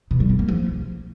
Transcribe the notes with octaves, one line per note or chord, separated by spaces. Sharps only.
B2
G3
C4
A#3
F3